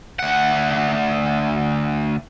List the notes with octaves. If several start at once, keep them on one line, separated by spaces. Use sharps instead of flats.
D2 F#5